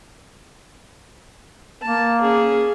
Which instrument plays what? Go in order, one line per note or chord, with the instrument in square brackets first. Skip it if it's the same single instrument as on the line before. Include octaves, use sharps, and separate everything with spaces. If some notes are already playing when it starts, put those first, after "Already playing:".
[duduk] A#3 [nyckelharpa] A5
[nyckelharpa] C#4 G#4